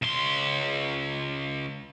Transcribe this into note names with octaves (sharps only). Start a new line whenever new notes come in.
C#2 C6